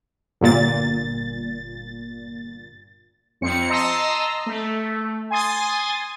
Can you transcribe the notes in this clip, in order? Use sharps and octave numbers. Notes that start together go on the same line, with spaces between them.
G1 A#2 A6
F2 C4 C#7
D#5 A5 A#5 C6 E6
A3
G#5 C6 D#6 A6